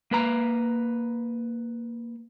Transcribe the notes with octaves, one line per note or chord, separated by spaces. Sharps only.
A#3 B4 A#5